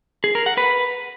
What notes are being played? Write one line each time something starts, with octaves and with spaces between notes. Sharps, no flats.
G#4
A#4
F#5
B4